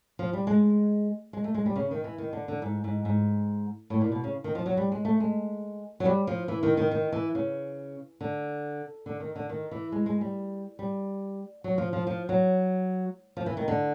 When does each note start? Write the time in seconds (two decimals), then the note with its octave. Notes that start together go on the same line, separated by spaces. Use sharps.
0.19 F3
0.33 G3
0.47 G#3
1.33 G#3
1.44 A3
1.54 G#3
1.66 G3
1.76 C#3
1.91 D#3
2.04 E3
2.18 D#3
2.33 D3
2.48 D3
2.62 G#2
2.84 G#2
3.05 G#2
3.90 A2
4.01 A#2
4.12 B2
4.24 C#3
4.44 D#3
4.55 F3
4.66 F#3
4.77 G3
4.92 G#3
5.05 A3
5.20 G#3
6.00 F#3
6.05 G3
6.27 F3
6.48 E3
6.63 D#3
6.77 D#3
6.91 D#3
7.12 E3
7.35 C#3
8.21 D3
9.06 D3
9.20 D#3
9.36 D3
9.49 D#3
9.71 E3
9.92 G#3
10.06 G#3
10.21 G3
10.79 G3
11.64 F#3
11.78 F3
11.93 F3
12.07 F3
12.29 F#3
13.37 F3
13.46 E3
13.57 D#3
13.68 D3